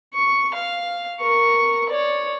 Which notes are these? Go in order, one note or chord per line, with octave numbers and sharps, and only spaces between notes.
C#6
F5
A#4 C#6
C#5 D5